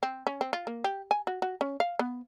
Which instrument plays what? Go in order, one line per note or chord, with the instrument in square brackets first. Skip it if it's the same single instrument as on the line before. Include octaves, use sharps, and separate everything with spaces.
[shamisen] C4
C#4
C4
F4
A#3
G4
G#5
F#4
F#4
C#4
F5
B3